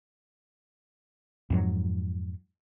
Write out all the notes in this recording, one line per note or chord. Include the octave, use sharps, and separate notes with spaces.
F2 G#2 F#3